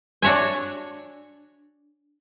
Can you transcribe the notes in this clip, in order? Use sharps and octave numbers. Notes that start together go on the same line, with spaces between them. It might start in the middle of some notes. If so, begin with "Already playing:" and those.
D4 F#4 C#5 E5 G#5